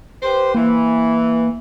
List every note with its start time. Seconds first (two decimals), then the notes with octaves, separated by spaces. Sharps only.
0.23 G4 B4 C5
0.55 E3 A#3